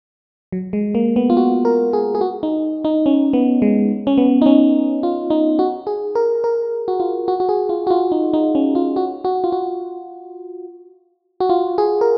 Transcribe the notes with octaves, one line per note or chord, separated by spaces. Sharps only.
F#3
G#3
A#3
B3
F4
F#4
A#4
G#4
G#4
F#4
D#4
D#4
C#4
B3
G#3
C#4
B3
D#4
C#4
F4
D#4
F#4
G#4
A#4
A#4
F#4
F4
F#4
F#4
G#4
F4
F#4
F4
D#4
D#4
C#4
F4
F#4
F#4
F4
F#4
F#4
F4
G#4
A#4